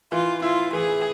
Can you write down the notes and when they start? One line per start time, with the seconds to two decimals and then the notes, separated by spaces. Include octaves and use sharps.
0.12 E3 F4
0.42 E4 F4
0.72 E3 G#4